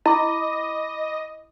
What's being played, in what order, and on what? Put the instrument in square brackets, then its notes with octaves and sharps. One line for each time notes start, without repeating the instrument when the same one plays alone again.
[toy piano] E4 [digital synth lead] D#5 [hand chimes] B5 D6